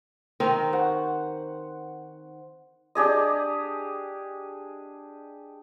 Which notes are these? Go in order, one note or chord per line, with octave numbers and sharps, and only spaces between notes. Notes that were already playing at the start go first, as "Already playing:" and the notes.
D#3 C4 D#4
C5 F#5 C#6
D4 G4 G#4 D#5